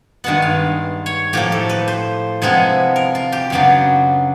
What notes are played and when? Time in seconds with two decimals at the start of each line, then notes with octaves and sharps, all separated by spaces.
0.24 G2 D#3 G#3 B3 F#5
0.42 F5
1.06 C#5
1.33 A2 F3 A#3 G4
1.52 A4
1.69 B4
1.88 C5
2.42 C3 F3 G#3 B3 E4
2.96 A#4
3.15 F4
3.32 G4
3.50 F#2 C#3 F#3 B3 D4